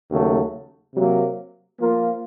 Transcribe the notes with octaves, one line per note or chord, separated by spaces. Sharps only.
D#2 C#3 F#3 A3
C3 F#3 A#3
F3 A#3 F4 A#4